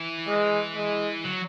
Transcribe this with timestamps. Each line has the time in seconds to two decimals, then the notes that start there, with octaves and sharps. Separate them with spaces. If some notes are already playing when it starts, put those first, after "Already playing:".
Already playing: E3
0.28 G#3
0.76 G#3
1.25 F#3